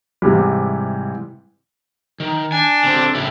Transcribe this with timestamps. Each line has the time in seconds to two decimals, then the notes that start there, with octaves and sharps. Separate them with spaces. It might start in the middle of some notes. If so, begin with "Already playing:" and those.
0.22 G#2 C3 E3 G3
2.20 D#3
2.52 D4 G#5
2.84 D3 C4
3.15 A2 C#3 E4